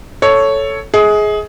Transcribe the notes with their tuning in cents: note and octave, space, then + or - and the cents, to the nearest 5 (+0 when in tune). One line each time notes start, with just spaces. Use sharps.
A4 +0 C#5 +5
G#4 +15 D#5 +40